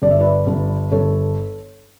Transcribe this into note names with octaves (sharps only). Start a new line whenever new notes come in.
G1 D5
E5
B4 D5
G1
G1 A4 C#5